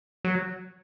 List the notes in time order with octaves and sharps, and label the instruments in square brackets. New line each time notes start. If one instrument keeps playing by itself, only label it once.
[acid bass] F#3